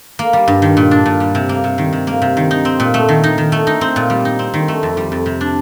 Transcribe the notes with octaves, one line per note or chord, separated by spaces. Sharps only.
A#3
G3
G2
D#3
A#2
D4
A#2
G3
C3
A#3
C3
D#3
C3
A#3
C3
D#3
D#4
C4
A#2
A3
D#3
D#4
D#3
A3
D#4
C4
A#2
G3
D#4
C4
D#3
A3
F2
G3
F2
C3
D4